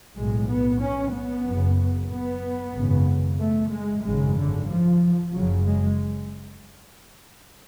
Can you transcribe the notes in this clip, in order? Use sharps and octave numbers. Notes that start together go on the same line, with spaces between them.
B1 A2 G#3
B3
C#4
B3
F#1 F#2 C#3
B3
G#1 F#2 C#3
A3
G#3
G#1 F#2 C#3 G#3
D3
F3
F#1 F#2 C#3 F#3
G#3